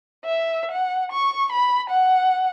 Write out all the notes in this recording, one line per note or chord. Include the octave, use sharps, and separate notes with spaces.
E5
F#5
C#6
B5
F#5